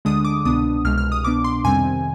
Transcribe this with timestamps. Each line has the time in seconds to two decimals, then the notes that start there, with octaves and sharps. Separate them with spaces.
0.05 D2 D3 G#3 D4 D#6
0.25 D6
0.45 C2 B2 B3 D4 D#6
0.85 C2 B2 G#3 F6
0.98 F6
1.12 D#6
1.24 C2 B2 B3 D4 D6
1.44 C6
1.64 F2 C3 D#3 G3 C4 G#5